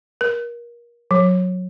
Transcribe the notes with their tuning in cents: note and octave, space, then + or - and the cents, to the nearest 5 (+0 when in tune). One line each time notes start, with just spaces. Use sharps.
A#4 +30
F#3 -20